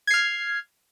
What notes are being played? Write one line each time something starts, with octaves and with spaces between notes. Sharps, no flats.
F6 G#6 C7